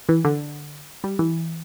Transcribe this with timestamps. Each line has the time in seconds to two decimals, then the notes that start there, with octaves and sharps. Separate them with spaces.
0.09 E3
0.25 D3
1.04 G3
1.19 E3